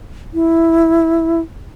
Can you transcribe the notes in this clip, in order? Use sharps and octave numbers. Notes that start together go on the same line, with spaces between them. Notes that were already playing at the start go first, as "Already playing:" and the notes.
E4